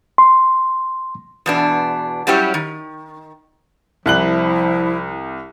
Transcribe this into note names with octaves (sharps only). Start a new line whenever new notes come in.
C6
E2 B2 D4
F#3 G3 C#4 E4 G4 C#5
D#3
C2 F3 E4 F#6 F#7